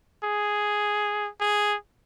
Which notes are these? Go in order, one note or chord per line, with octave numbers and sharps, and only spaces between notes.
G#4
G#4